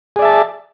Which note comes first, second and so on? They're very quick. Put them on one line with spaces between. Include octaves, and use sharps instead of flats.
G#4 D5 E5 A5